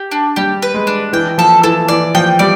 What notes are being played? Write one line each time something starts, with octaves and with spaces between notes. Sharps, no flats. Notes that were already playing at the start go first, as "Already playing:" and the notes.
Already playing: G4
D4
G3 G4
B4
G#3
D4
E3 G5
F3 A4
E3 A4
E3 D5
F3 G5
G3 D5